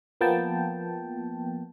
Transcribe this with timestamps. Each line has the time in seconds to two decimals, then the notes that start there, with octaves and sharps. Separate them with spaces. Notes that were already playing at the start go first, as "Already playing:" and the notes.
0.21 F3 A#3 B3 G5 A5